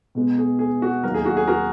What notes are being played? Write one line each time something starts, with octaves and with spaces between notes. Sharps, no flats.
B2 G#3 B3
G#4
G#4
F#4
D#2 D#3 F#3 A#4
G#4
F#4
G#4
F#4 A#4